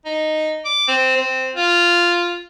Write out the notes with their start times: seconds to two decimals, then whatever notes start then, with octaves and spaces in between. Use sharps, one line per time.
0.05 D#4
0.65 D6
0.88 C4
1.17 C4
1.56 F4